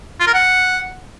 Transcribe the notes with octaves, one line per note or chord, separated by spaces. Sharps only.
F4
A#4
F#5